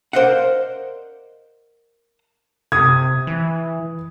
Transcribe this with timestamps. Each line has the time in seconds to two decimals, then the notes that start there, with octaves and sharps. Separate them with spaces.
0.13 A#4 C5 D5 D#5 F5 F#5
2.72 C3 D#6 G#6
3.27 E3